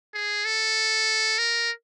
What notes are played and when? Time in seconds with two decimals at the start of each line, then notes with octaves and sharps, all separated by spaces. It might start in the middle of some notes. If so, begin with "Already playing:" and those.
0.14 G#4
0.45 A4
1.38 A#4